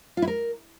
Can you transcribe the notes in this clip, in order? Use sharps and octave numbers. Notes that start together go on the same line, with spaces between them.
F4
E4
A#4